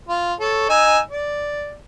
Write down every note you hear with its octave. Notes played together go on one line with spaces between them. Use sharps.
F4
A4 C#5
D#4 G#5 E6
D5